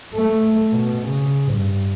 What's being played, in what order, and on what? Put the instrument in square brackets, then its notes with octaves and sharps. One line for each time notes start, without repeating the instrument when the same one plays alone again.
[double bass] A3
B2
C#3
G2